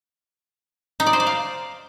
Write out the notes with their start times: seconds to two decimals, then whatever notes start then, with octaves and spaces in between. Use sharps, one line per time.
1.00 D#4
1.06 D5
1.13 C5
1.20 D5
1.27 F5